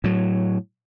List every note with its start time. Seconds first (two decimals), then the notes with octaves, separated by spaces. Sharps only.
0.04 A2 F#3